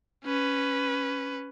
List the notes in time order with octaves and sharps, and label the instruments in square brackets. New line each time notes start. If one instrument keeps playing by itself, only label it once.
[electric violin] C#4 B4